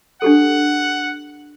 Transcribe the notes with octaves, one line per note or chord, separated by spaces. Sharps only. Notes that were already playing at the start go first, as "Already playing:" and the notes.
D4 G4 A4 F#5